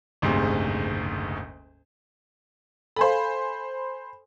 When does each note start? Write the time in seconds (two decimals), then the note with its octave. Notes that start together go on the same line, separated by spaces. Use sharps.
0.22 F#1 D2 G#2 C3
2.96 A4 C5 F5 G#5 B5